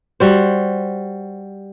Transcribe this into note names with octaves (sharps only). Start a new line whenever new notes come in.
G3 F#4 C5